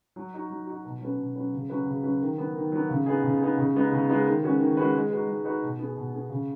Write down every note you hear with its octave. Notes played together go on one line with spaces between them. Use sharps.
F#3
D#4 F#4
F#3
D#4 F#4
B2
F#3 C#4 B4
B2
F#3 C#4 B4
C#3
F#3 C#4 B4
C#3
F#3 C#4 B4
D#3
F#3 B3
D#3
F#3 B3
C#3
B3 D#4 G#4
C#3
B3 D#4 G#4
C#3
G#3 B3 D#4
C#3
G#3 B3 D#4
D#3
G#3 C#4 F#4 B4
D#3
G#3 C#4 F#4 B4
G#3
D#4 F#4 B4
G#3
D#4 F#4 B4
B2
B3 G#4
B2
B3 G#4
C#3